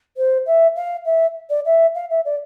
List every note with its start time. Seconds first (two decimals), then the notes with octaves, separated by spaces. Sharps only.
0.17 C5
0.46 E5
0.76 F5
1.05 E5
1.50 D5
1.65 E5
1.95 F5
2.10 E5
2.25 D5